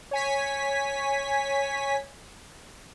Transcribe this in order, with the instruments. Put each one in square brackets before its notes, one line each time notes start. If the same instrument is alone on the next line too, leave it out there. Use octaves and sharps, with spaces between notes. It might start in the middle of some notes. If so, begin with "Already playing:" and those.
[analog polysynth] C#5 G#5 B6